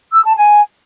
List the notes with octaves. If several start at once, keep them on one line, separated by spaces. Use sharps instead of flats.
E6
A5
G#5